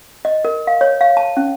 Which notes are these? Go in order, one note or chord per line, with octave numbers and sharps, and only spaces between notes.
D#5
A#4
F5
C#5
F5
A5
C#4